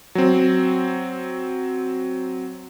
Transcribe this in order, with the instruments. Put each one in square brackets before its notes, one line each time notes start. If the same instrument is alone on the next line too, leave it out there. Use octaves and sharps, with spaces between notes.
[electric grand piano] F#3 C4